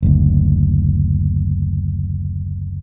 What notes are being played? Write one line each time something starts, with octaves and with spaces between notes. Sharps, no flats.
F#1 D2